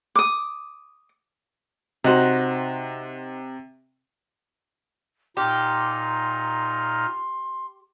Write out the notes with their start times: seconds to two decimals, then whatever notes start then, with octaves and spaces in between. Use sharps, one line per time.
0.15 D6 D#6
2.04 C3 D#4 F#4 C5
5.37 A#2 D#4 G4 C6 F6